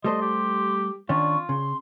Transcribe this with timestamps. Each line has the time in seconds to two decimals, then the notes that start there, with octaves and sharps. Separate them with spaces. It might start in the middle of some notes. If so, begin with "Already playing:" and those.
0.04 G3 A3 C5 D#5 C6
0.22 G4
1.09 D#3 C#4 D4 F4 C#6
1.49 C#3 C6